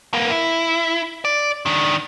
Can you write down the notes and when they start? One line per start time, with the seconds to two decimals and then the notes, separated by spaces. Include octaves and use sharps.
0.14 A#3 B3
0.31 E4
1.25 D5
1.66 D#3 D4